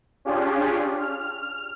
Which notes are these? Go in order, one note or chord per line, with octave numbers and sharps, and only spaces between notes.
C#4 D4 F4 G4 G#4
F6